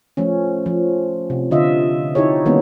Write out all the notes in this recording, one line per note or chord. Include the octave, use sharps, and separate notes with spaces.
F3 A3 C#4
F3
C3
D3 F4 D#5 E5
D#4 E4 G4 A4 C#5
D#3 G3 A#3 B3 C#4